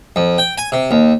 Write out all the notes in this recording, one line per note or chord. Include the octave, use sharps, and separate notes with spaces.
F2
G5
G#5
C3
D#2